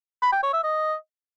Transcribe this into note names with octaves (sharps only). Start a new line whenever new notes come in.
B5
G5
C#5
E5
D#5